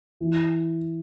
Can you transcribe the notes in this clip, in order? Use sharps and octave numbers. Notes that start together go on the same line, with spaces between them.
E3